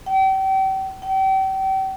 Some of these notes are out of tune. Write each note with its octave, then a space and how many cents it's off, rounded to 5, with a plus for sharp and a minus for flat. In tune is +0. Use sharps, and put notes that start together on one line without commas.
G5 -35
G5 -35